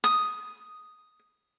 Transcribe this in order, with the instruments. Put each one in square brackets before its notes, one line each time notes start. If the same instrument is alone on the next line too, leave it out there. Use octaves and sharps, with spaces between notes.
[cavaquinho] D#6